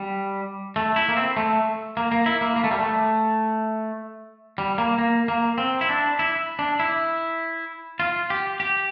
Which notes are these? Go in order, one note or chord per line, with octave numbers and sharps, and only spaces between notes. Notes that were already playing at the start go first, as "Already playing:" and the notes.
Already playing: G3
A3
E4
A#3
C4
A3
A#3
A#3
E4
A#3
A#3
A3
G3
A3
G3
A#3
A#3
A#3
C4
E4
D4
E4
D4
E4
F4
G4
G4